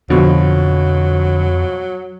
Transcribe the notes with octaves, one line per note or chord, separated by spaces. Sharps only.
F2 B2 D3 F3 F#3